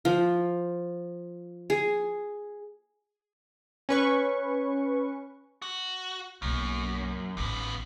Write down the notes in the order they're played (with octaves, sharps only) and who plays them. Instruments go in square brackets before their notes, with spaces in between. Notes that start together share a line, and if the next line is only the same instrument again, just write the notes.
[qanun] F3
G#4
[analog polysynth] C#4 B4 C#6
[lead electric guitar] F#4
[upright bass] B1 A#3 [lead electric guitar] F#2
[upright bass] A1 D#4 [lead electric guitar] D#2 B3